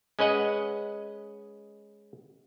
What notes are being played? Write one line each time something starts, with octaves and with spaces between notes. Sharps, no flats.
G#3 C#4 B4 D#5 F#5